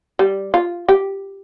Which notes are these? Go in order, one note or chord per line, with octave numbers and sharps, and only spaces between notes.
G3
F4
G4